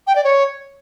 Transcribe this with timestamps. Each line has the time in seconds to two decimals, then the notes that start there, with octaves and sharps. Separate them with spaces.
0.07 G5
0.16 D5
0.24 C#5